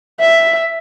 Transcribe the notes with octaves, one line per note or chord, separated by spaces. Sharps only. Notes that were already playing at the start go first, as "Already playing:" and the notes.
E5